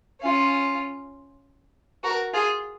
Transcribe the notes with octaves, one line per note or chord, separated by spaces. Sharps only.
C#4 F4
F#4 A#4
F4 G#4